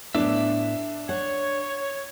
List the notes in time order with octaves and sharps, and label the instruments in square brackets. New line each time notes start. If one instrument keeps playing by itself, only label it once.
[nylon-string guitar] A2 B3 [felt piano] D4 [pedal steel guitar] E5 D6
[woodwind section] C#5 [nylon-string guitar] F#5